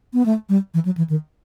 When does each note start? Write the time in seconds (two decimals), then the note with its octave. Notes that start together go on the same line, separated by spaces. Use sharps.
0.13 B3
0.25 A3
0.49 G3
0.74 E3
0.85 F#3
0.97 E3
1.09 D#3